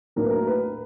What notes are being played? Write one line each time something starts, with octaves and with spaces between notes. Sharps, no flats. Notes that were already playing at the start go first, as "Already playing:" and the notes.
A2 F#3 A#3 D4 A#4
B4
A#4
B4